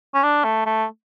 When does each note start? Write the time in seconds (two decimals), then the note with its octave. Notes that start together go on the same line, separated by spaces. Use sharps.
0.14 C#4
0.23 D4
0.44 A3
0.66 A3